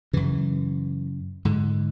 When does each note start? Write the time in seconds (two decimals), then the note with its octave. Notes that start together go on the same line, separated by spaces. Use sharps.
0.13 F#2 C#3 E3
1.45 G#2 D3